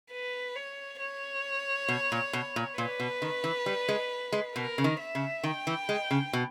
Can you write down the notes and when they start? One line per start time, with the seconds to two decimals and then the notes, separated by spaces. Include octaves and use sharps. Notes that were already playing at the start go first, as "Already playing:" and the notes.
0.11 B4
0.55 C#5
1.00 C#5
1.88 B2
2.12 A#2
2.33 B2
2.56 A#2
2.77 A#2 B4
3.00 B2
3.22 D#3
3.44 E3
3.66 G3
3.88 G#3
4.32 G#3
4.55 B2 A#4
4.78 C#3
4.84 D#3
5.00 E5
5.15 C#3
5.43 D#3 G5
5.67 E3
5.89 G#3
6.11 C#3
6.33 B2